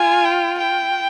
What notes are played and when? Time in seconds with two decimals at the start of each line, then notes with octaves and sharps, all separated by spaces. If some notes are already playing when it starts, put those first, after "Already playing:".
Already playing: F4 G#5
0.25 G5
0.58 G5